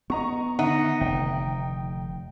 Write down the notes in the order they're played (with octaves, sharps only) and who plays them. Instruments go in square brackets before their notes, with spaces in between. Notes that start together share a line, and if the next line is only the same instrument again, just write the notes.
[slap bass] B3 [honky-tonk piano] D#5 A#5 C#6
[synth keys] D3 D#3 [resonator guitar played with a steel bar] D#4 [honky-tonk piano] E5 F#5
[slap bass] F1 [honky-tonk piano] G5